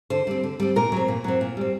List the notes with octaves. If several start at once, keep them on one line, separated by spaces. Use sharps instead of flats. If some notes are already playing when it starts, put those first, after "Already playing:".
D3 C5
G3 C4
D3
G3 C4
A#2 A#4
F#3 C4
A#2
F#3 C4
A#2
G3 C4